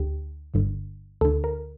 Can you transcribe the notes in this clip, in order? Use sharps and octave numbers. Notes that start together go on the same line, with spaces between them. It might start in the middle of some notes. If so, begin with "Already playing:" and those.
Already playing: D2 D3 G4
G1 G2 D3
D2 D3 A4
A#4